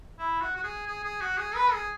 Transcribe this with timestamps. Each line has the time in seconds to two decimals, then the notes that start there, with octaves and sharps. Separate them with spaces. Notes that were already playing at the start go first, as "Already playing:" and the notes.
0.19 E4
0.41 F#4
0.56 F#4
0.63 G#4
0.87 G#4
1.03 G#4
1.21 F#4
1.38 G#4
1.55 B4
1.72 G#4